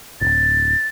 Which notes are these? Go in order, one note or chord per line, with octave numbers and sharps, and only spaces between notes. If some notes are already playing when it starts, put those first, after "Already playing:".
D1 G1 A6